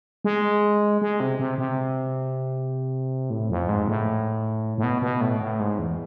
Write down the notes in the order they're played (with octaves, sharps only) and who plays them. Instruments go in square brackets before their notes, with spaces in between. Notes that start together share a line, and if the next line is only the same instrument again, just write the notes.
[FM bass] G#3
G#3
C3
C3
C3
A2
F2
G#2
A2
A2
B2
B2
A2
A2
G#2
E2